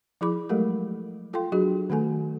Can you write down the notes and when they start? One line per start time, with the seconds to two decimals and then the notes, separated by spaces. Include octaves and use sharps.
0.21 F3 E4 G#4 B5 D6
0.49 F#3 G#3 A3 G4 A4 A#4
1.33 F4 A4 F5 G5 C6
1.52 F#3 D4 F#4 G#4
1.90 D#3 A3 A4 G#5